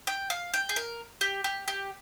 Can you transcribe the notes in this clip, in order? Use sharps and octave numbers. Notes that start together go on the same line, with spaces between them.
G5
F5
G5
G#4
A#4
G4
G4
G4